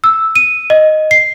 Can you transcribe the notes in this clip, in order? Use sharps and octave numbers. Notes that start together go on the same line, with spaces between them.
E6
D#7
D#5
C7